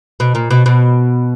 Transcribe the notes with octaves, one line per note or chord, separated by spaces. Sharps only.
B2
A#2
B2
B2